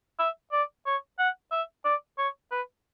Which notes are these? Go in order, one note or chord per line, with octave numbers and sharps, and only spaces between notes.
E5
D5
C#5
F#5
E5
D5
C#5
B4